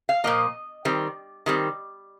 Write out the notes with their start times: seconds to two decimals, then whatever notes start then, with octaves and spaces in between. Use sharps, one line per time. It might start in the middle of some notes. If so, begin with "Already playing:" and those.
0.09 F5
0.24 A#2 F3 A#3 D#5
0.85 D#3 G3 C4
1.46 D#3 G3 C4